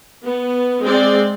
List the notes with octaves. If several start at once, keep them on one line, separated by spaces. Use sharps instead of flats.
B3
G#3 C4 D5